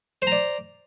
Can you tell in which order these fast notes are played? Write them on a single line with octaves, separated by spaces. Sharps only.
C5 A#5 D5